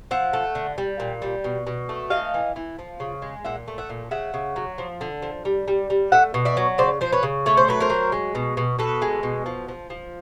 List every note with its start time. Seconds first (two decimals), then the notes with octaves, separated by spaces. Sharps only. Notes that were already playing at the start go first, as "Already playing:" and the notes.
0.11 F3 E5 F#5
0.33 A3
0.55 D3
0.78 G3
1.00 A#2
1.22 G3
1.44 B2
1.67 B2
1.89 A3
2.10 E3 D#5 F5
2.34 E3
2.56 E3
2.79 F3
3.00 C#3
3.22 G#3
3.45 A#2 E5 F#5
3.68 A3
3.78 E5 F#5
3.89 A#2
4.11 C#3 E5 F#5
4.34 C#3
4.56 F#3
4.78 F3
5.01 D3
5.22 F3
5.45 G3
5.68 G3
5.90 G3
6.12 A3 E5 F#5
6.34 B2
6.45 D5 E5
6.57 F#3
6.78 C#3 C5 D5
7.01 F3 C5
7.12 B4 C#5
7.23 C#3
7.46 A3 C#5
7.57 C5
7.68 F#3 B4
7.80 A#4 C5
7.90 F#3
8.12 G#3
8.35 B2
8.57 B2
8.79 B2 A4 B4
9.02 G#3
9.23 B2
9.46 F3
9.68 F3
9.90 F3